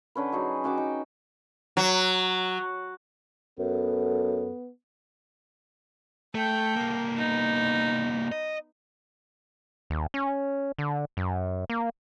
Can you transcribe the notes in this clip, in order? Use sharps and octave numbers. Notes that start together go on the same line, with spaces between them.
D3 C#4 B4
F#3 D#4 F#4 G#4
C#4 F#4 G5 D6
D#4
F#3
F#2 B3 A4
A3 A4 G5
C2 A#3
B3 D#4
D#5
D#2
C#4
D3
F#2
A#3